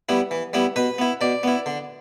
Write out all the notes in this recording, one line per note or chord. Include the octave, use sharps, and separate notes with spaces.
G3 B3 E4
E3
G3 B3 E4
B2 B4
B3 E4
B2 D5
B3 E4
D3